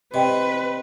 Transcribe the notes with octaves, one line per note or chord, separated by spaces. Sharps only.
C3 B4 D5 D#5 G5